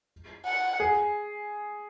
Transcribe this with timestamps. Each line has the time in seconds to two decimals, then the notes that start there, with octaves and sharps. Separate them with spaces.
0.46 F#5
0.80 G#4